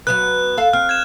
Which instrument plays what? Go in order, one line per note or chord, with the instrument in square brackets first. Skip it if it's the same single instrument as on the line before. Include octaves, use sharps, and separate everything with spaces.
[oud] F#3 B3 B4 [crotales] F#6
[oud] A4 F5
[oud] C4 [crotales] F6
[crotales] G#6 E7